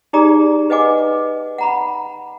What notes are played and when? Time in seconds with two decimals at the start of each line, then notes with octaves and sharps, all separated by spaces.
0.13 D#4 G4 G#4 D5 A#5 D#6
0.70 B4 D#5 F#5 G#5 D6
1.58 F#5 A#5 B5